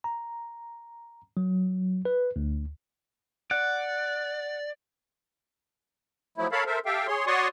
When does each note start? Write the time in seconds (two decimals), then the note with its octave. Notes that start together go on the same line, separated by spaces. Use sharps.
0.04 A#5
1.37 F#3
2.05 B4
2.36 D2
3.51 D5 F#5
6.38 F3 F#3 A3 E4
6.52 A4 A#4 C#5 F5 A5 B5
6.66 A4 A#4 C5 E5
6.86 G4 A4 E5 F5 G5
7.07 G#4 C#5 C6
7.27 F#4 C#5 D5 C6 C#6 D#6